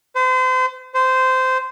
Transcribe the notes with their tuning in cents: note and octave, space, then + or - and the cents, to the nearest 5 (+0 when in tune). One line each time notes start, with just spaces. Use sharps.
C5 -35
C5 -15